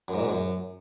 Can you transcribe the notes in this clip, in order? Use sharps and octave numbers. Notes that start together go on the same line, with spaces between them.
F#2
G#2
A#2
G#2
F#2